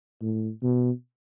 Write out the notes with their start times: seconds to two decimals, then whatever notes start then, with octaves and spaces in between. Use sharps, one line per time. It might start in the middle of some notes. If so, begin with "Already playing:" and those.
0.22 A2
0.63 B2